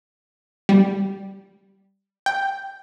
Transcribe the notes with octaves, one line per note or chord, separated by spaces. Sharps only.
G3
G5